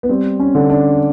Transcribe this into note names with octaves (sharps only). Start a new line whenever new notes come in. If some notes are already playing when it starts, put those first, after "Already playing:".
B3
G3 C4
C#4
D3
D4